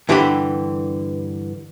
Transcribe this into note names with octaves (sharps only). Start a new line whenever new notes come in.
G2 D3 E3 G4 A#5 B5